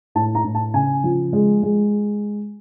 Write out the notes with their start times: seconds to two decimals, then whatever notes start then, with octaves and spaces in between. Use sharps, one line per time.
0.15 A2 A5
0.35 A#5
0.44 A2
0.55 A5
0.74 C#3 G#5
1.04 F3
1.33 G#3
1.63 G#3